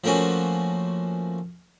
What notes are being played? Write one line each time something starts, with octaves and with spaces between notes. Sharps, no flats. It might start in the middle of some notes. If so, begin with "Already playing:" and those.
F3 A3 A#3 C#4 F#4